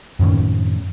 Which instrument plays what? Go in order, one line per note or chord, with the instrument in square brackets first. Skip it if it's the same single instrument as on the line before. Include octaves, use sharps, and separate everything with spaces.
[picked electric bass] F#2 A2 D#3 C#4